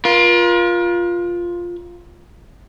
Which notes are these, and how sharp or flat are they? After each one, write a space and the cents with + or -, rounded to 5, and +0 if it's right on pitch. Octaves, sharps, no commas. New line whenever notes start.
F4 +0 A#4 +45